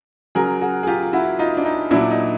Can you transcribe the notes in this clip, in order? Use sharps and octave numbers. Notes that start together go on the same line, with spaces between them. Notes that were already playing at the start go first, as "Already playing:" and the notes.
C#3 F#3 G#4 A#4
F#4 G#4
G#4
F4 G4
E4 F#4
D#4 F4
D4
D#4
A#2 F#3 D4 E4
D#4